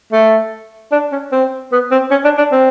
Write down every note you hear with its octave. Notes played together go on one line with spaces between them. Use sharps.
A3
D4
C#4
C4
B3
C4
C#4
D4
D4
C4